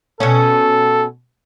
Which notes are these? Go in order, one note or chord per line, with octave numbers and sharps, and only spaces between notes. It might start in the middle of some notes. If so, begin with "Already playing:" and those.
B2 C#4 A4